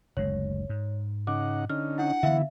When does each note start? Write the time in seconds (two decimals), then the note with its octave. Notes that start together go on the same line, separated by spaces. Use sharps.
0.17 F#1 D2 G#3 C#5
0.69 G#2
1.27 C#3 D#4 F#5 D6
1.70 D3 C#4 D#4 F6
1.98 D4 E4 F#5
2.23 D3 E3 B3 E4 E5 F5